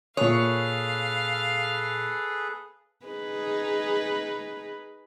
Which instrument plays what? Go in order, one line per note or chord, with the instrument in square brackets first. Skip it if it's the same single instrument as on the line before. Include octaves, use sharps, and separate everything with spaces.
[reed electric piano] A#2 D#6 [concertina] G#4 A4 B4 [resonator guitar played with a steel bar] C#5 [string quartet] F5
[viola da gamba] D#4 G#4 B4